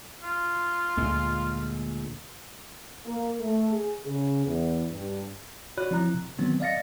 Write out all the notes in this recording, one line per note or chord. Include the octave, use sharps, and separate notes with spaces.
F4
D2 A#2 D3 G#3
A#3
A3
G#4
C#3
E2
G2
F#4 C#5 D5 B5 F#6
F3 C4 E4 A#5 F#6
C3
D#3 F#3 B3 C4
D5 D#5 F5 A6 A#6 C#7